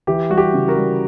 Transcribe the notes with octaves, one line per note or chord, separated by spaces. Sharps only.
E3 G4
G3 F#4
G4
C#3
F#4 A#4
G3